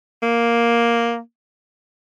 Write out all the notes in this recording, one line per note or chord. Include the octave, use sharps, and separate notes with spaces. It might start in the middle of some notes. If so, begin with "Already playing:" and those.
A#3